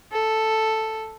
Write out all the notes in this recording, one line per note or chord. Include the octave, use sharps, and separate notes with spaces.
A4